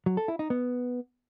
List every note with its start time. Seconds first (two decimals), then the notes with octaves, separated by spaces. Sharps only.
0.06 F#3
0.17 A4
0.28 E4
0.39 D#4
0.50 B3